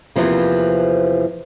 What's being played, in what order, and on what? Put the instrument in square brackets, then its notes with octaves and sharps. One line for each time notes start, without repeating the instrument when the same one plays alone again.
[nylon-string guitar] E2 C3 E3 F3 A#3